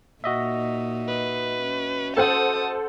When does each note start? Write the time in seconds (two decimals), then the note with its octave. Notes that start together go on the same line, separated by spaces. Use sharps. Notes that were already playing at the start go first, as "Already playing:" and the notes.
0.24 A#2 D#4 F#4 D#5 E5
1.08 B4
1.63 C#4
2.17 A4 C5 F#5 A5 D#6